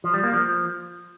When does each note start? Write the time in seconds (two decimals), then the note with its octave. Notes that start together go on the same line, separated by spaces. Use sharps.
0.04 F3
0.14 G3
0.24 A#3
0.34 F3